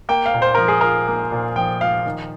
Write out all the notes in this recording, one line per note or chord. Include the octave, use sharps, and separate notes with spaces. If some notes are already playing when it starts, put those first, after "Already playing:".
A#3 G5
F5
A#2
C5
F3 A#4
G#4
F4 A#4
A#3
A#2
F3 G5
F4 F5
D#3